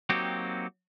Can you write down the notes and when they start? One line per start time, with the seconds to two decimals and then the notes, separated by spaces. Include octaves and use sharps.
0.09 F#3 A#3 C4 D#4 F#4 G4